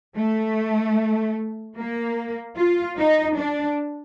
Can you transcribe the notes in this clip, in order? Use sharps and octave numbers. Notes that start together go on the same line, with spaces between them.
A3
A#3
F4
D#4
D4